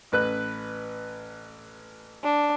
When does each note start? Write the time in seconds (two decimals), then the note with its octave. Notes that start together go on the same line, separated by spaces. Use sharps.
0.12 A1 B4 F#6
2.24 D4